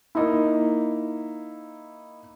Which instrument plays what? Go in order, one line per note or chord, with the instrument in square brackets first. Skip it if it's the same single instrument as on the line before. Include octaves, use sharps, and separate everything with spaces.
[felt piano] A#3 D#4 E4